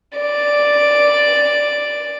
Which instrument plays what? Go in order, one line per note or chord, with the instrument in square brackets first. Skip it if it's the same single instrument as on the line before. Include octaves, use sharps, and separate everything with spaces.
[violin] D5 D7